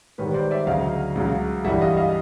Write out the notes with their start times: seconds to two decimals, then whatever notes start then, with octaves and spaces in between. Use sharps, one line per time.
0.18 G#2 D#3 G3 B4 C#5
0.34 C5 D5
0.51 D5 E5
0.67 D2 C#3 F#3 D#5 F5
1.15 C#2 C#3 F#3
1.64 G2 E3 G3 E5 F#5
1.81 D#5 F5
1.97 D#5 F5